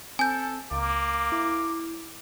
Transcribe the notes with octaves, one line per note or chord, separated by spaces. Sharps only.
C4 A4 G#5 G6
C#2 A#3 D6
E4